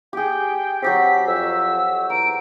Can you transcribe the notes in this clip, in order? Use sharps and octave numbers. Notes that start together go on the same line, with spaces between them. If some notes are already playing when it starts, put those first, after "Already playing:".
G4 G#4 G5
F#3 C4 G4 G#4 B6
F2 E6
E2 A#5 D7